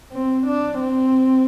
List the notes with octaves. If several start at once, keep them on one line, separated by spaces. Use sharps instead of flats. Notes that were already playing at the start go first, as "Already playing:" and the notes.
C4
D4
C4